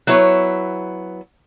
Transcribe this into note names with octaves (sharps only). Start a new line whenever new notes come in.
F#3 B3 E4 C#5